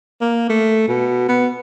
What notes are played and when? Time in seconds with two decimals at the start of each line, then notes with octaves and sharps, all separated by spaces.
0.21 A#3
0.49 A3
0.88 B2
1.28 B3